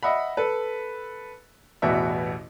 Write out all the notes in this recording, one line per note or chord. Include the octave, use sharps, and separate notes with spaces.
D#5 E5 F#5 B5
A4 B4
A1 E2 B2 F#4 E5